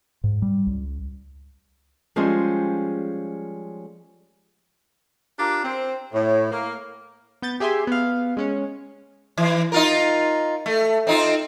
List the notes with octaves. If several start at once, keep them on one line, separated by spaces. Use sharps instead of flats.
G#2
G3
C#2
F3 G3 G#3 C#4 G#4 C5
D4 F4 G4 A#4
C4
A2
A#3
B3 G6 A6
G4 G#4 E5 G#5 C6
B3 F5
G#3 C#4 C#5
E3
D#4 F4 A#4
A3
C4 D#4 F4